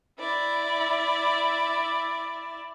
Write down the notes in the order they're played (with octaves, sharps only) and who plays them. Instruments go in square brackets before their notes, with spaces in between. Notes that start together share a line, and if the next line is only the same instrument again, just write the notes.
[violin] E4 D5